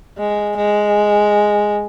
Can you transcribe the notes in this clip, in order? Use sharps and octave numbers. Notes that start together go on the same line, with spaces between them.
G#3
G#3